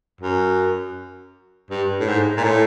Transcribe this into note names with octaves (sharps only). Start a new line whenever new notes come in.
F#2
G2
A2
G#2
A#2
A2